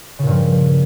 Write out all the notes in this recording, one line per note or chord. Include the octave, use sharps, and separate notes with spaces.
G2 A#2 C#3 F3